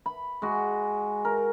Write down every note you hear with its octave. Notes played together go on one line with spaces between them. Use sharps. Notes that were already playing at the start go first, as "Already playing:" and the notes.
B5
G#3 F#4
A#4